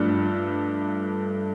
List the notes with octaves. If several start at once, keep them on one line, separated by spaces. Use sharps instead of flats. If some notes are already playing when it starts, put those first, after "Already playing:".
Already playing: G2 F3 A3 D4 A4